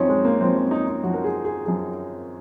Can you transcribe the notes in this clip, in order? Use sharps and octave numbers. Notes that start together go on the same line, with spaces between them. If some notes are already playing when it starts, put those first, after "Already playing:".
Already playing: F#2 F3 C4 C#4 D#4
G#3
A#3
F#2 F3 C4
C#4
D#4
D#4
F#2 F3 F#4
A#4
G#4
G#4
F#2 F3 G#4